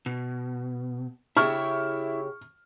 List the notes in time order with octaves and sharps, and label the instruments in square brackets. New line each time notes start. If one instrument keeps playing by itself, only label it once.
[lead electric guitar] B2
[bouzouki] C#3 G4 [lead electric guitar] E4 E5 [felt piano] C#6 F6